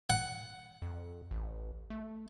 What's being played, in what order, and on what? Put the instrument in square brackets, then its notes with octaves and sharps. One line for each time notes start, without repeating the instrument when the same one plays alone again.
[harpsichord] F#5
[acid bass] F2
A1
A3